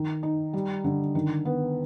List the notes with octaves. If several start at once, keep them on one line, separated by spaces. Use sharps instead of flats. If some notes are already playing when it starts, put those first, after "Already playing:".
Already playing: D#3
D#4
G3
D3
D#3
B3